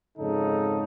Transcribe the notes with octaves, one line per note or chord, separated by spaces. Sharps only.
F2 G#2 C#3 D#4 A4